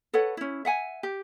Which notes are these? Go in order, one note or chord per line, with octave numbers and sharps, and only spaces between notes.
A4 B4 C#5 F#5
C#4 E4
E5 F#5 G#5
G4